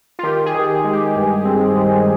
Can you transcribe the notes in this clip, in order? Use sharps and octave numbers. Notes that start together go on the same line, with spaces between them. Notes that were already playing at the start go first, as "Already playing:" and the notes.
F4
D#3 G4
G#4
D#3
G#3
G4
G2
C4
G#3